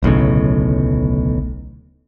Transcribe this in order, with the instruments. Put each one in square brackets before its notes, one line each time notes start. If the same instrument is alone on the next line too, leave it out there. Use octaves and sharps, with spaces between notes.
[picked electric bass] D1 B1 A2 C#3